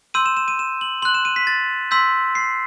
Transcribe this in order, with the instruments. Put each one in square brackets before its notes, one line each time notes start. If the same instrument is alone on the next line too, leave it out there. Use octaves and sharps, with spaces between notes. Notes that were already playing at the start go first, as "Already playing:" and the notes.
[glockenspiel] C6 E6 G6 D#7
E7
E7
D#7
E7
F#7
C6 F#6 F#7
E7
D#7
B6
A6
C6 E6 G6 B6
C7